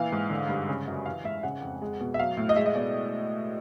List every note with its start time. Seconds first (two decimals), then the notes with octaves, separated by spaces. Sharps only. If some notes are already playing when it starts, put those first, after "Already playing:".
Already playing: A#2 E3 F5
0.12 G#2
0.30 D3
0.49 G2
0.69 C#3
0.88 F#2
1.06 E3 F5
1.24 G#2 E5
1.43 C#3 F#5
1.62 F2
1.82 G#3
2.00 B2
2.14 E5
2.19 F#3 F5
2.37 A2
2.49 D#5
2.56 G#3 E5
2.66 D#5
2.75 B2 D5